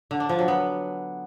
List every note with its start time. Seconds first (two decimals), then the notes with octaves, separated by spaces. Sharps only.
0.11 D3
0.20 D4
0.29 F3
0.39 F#3
0.48 B3